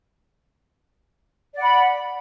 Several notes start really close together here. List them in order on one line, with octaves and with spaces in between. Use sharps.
D5 F#5 B5